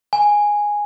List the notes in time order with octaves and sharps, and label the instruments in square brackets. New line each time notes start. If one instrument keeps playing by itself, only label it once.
[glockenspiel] G#5